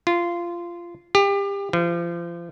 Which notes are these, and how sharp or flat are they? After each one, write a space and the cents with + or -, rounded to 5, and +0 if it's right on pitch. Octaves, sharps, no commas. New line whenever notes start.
F4 -15
G4 +30
F3 -35